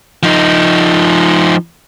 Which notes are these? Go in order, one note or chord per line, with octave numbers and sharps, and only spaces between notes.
F3 D#4